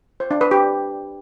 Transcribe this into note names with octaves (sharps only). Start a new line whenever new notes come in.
C5
D4
B4
G4